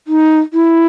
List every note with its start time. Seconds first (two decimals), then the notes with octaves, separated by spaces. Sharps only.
0.07 D#4
0.53 E4